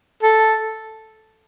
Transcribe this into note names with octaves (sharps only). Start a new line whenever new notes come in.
A4